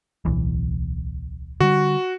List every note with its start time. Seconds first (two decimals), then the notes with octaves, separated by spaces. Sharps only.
0.25 D1 B1 E3
1.60 D3 G3 F#4